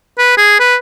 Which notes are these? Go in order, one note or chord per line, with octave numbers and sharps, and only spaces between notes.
B4
G#4
B4